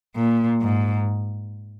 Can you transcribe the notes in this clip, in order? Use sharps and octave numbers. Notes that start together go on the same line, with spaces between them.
A#2
G#2